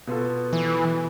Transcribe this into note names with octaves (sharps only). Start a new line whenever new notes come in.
B2 B3 F4 A4
E3